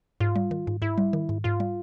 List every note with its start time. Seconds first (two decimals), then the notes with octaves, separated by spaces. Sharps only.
0.20 G#2 F4
0.36 G3
0.51 D#3
0.67 G#2
0.82 G#2 E4
0.98 G3
1.13 D#3
1.29 G#2
1.44 G#2 F4
1.60 G3